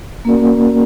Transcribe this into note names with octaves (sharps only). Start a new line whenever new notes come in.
A#3 C#4 F#4 A#4 D5